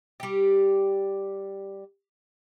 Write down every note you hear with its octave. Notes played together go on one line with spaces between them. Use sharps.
G3 G4